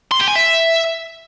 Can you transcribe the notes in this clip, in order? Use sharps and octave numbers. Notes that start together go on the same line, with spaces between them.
C6
G4
G#5
E5